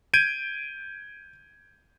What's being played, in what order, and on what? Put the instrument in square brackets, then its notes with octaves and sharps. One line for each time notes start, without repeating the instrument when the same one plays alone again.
[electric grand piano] G6 G#6 D7 D#7